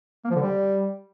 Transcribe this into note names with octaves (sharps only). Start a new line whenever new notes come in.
A#3
F3
D3
G3